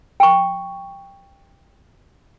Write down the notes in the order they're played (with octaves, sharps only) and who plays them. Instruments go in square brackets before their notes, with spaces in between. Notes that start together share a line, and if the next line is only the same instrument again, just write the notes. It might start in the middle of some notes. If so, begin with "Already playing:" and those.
[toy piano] G5 C#6